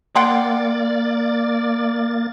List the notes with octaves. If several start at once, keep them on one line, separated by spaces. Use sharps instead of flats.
A#3 D5 F#5 G5 C6 A6